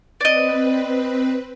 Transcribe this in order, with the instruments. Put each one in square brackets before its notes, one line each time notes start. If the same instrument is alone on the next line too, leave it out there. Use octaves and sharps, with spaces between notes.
[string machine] C4 B4 [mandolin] D5 D#5